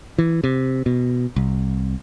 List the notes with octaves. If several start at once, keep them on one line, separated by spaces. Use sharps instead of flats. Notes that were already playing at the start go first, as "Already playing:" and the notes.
E3
C3
B2
C2